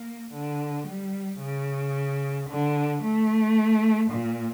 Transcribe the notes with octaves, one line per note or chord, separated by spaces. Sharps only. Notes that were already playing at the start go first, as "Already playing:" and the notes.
Already playing: A#3
D3
G3
C#3
D3
A3
A#2